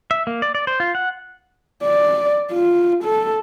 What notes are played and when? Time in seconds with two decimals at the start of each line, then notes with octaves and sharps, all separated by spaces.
0.11 E5
0.27 A#3
0.42 D5
0.55 D5
0.67 C5
0.80 F4
0.95 F#5
1.84 D5
2.52 F4
3.03 A4